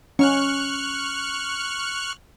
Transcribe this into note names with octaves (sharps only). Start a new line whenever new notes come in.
C#4 C#6 F6 F#6